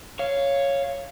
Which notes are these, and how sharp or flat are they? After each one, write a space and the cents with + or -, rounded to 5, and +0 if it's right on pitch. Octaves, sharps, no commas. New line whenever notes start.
C#5 +0 F5 -10